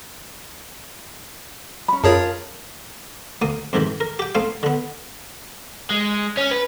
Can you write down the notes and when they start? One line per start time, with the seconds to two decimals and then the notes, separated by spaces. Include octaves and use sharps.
1.88 C#4 B5
2.04 F#2 F4 G#4 A#4 C#5 A5
3.42 D2 A#3 D#6
3.73 F2 G#2 C3 D#3 E3
4.00 A#4
4.19 G4 G5
4.35 A3 C4 D#4 F5
4.63 D3 B3
5.90 G#3
6.37 C#4
6.51 B4